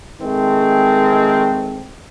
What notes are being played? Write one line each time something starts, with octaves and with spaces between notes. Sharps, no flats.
D#3 G#3 A3 C4